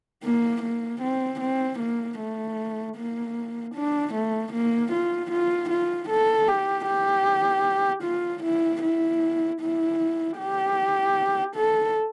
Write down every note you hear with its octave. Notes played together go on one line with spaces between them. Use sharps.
A#3
A#3
C4
C4
A#3
A3
A#3
D4
A3
A#3
F4
F4
F4
A4
G4
G4
F4
E4
E4
E4
G4
A4